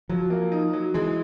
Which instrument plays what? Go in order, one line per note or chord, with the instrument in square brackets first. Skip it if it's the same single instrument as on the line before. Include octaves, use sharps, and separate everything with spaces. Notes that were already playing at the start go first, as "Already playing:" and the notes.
[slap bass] F3 [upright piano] F#3
[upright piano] A#3
D#4
F#3
[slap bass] E3 [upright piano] G#3